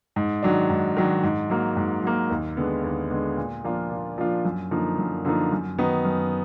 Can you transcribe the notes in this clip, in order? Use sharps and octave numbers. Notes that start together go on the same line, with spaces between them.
G#2
D#3 F#3 D4
G#2
D#3 F#3 D4
G#2
F#3 A#3
G#2
F#3 A#3
D#2
D3 G#3 B3
D#2
D3 G#3 B3
A#2
F3 A#3 D4 F4
A#2
F3 A#3 D4 F4
F#2
D3 F3 A#3 D#4
F#2
D3 F3 A#3 D#4
F#2
D#3 F#3 B3 D#4
F#2